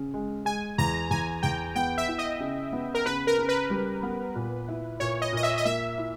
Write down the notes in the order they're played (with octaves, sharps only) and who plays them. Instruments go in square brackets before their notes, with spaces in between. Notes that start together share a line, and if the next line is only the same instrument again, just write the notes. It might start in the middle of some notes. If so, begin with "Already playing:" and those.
Already playing: [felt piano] C#3
G#3
[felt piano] G#3 [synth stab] G#5
[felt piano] E2 [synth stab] A#5
[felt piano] E2 [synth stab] G#5
[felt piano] E2 [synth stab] G5
[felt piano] B3 [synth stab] G5
[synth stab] E5
[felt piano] E4
[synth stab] D#5
[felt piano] C#3
B3
[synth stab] A#4
[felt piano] C#3 [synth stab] B4
[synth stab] A#4
[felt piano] C#3
[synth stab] B4
[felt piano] G3
B3
A#2
E4
[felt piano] A#2 [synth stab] C#5
[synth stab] D#5
[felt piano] A#2 [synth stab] D#5
[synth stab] E5
D#5
[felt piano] A#3 [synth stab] E5
[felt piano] E4